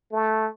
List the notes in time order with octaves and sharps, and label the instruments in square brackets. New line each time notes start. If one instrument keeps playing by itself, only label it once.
[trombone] A3